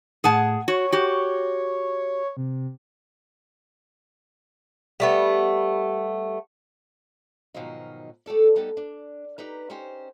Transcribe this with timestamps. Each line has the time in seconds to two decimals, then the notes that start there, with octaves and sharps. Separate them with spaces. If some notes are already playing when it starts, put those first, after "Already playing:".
0.24 A2 G#4 F#5 A5
0.68 F#4 C#5
0.92 F#4 G4
2.37 C3
5.00 G3 A3 B3
7.54 G#2 B2 D#3 F3 F#3 D#4
8.26 A3 G4 A4 D5
8.56 G3 B3 D#4 G4 A4
8.77 D4
9.38 D#4 G4 B4 A#5
9.70 C#4 D#4 G4 C5